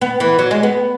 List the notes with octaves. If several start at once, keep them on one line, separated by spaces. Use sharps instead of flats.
B3
E3
F#3
G#3
B3